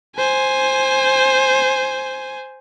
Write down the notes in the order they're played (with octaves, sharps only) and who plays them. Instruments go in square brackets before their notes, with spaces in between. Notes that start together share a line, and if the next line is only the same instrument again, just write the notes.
[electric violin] C5 G#5